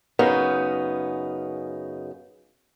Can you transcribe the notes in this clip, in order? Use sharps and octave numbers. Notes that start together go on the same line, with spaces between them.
F#2 C#3 B3 D#4